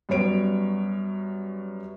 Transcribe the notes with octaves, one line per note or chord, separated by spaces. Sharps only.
F#2 G3 B3 C#5 D7